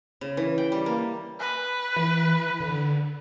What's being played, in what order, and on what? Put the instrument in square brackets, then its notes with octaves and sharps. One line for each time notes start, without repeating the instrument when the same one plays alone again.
[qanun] C#3
E3
G5
G3
A#3
[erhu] B4
[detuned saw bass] E3
D3